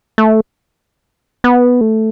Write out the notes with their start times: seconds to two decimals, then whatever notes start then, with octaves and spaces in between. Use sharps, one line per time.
0.18 A3
1.44 B3
1.81 A3